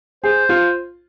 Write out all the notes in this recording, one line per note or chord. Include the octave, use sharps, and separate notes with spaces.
G#4 C5
F4